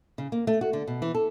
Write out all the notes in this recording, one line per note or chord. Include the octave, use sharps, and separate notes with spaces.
C#3
A#3
A3
F#4
D3
B2
E3
A4